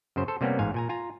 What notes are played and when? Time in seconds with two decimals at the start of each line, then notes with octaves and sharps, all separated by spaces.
0.16 F#2 C#3 C5
0.28 A4 C5
0.41 C3 G3 A#3 B3 C#4
0.59 A1 G#2 F5 G#5
0.74 A#2 G#5 A#5
0.89 F4 G#5 A#5